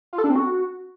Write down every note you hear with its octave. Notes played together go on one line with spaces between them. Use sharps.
F4
A4
D4
C4
F#4